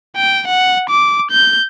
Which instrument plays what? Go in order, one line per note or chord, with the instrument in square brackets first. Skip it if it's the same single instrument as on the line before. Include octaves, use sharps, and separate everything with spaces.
[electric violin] G5
F#5
D6
G6